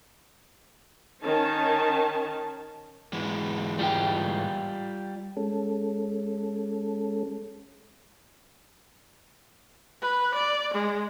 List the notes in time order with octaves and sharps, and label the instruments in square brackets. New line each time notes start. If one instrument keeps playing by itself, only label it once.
[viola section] D#3 C#4 A5
[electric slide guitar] G#2 E3 G#3
[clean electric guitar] G3 F4 G5
[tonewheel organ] G#3 C#4 A4
[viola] B4
D5
G#3